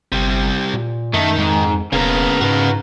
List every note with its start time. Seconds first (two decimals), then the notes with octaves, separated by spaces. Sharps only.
0.12 G1 C3 G3
0.73 A#2
1.14 F#2 D#3 A3 D#4
1.38 F2 G#2
1.93 E1 C#3 A#3 B3 A#4
2.41 G#2 F#4 B4